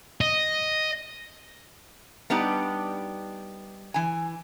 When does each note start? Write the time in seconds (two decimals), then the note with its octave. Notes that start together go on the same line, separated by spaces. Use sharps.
0.21 D#5
2.30 G3 B3 D4 D#4 G4
3.94 E3 G#5